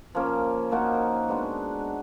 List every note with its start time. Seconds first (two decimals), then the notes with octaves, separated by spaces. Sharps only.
0.15 F3 A#3 C#4
0.72 F3 A#3 D#4 F#4
1.28 G#3 B3 D4 F#4